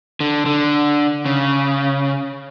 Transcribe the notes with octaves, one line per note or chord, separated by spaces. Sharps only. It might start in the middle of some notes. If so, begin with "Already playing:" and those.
D3
D3
C#3